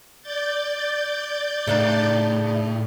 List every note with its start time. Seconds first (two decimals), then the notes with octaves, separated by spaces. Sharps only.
0.22 D5 G6 A6
1.67 A2 C#3 D4 D#4